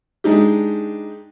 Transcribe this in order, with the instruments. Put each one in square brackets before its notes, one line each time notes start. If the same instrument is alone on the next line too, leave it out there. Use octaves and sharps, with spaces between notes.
[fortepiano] G#3 D4 D#4 G4